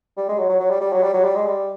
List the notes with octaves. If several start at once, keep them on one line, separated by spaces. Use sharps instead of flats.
G3
G#3
F#3
F#3
F#3
G3
G3
F#3
G3
F#3
G3
G#3
G3